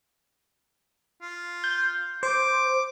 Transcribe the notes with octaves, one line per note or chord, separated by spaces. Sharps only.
F4
G6
C5 D6